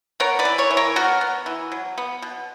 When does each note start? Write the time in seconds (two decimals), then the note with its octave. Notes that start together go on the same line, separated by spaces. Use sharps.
0.20 B3 A#4 C#5
0.39 B4 D5
0.45 E3
0.58 A#4 C#5
0.71 E3
0.77 A#4 C#5
0.96 B3 F#4 A#4
1.21 B3
1.46 E3
1.72 F#3
1.98 B3
2.22 B2